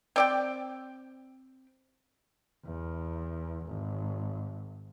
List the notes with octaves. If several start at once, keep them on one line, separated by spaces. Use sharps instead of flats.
C4 D5 G5
E2
G#1